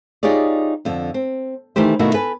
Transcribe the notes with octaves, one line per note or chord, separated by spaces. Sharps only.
D#4 F4 G4 G#4 C#5 D5
F2 D3
C4
D#3 E3 A3 G4 C5
B2 D#3 A3 A#3 E4 F#4
A4 B4 G#5